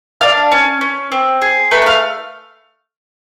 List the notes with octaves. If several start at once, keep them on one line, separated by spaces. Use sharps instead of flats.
D4 F5 F6
C#4
C#4
C4
G#4
A3 B4 B5
F#6
F5 F6